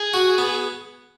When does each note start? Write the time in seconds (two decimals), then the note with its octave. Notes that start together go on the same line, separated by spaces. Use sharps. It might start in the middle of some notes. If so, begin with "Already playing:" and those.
Already playing: G#4
0.14 F#4
0.38 B3